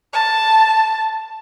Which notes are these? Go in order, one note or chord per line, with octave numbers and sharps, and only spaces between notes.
A5